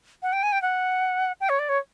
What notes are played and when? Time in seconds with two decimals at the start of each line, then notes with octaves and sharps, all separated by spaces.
0.22 F#5
0.33 G5
0.43 G#5
0.52 G5
0.62 F#5
1.41 G5
1.49 C#5
1.59 D5
1.69 C#5